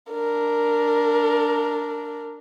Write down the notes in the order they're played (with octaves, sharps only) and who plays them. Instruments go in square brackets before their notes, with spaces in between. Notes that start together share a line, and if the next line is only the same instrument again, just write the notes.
[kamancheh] D4 A#4